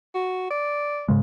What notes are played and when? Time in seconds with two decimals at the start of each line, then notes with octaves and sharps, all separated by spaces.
0.14 F#4
0.51 D5
1.08 G#2 C#3 G#3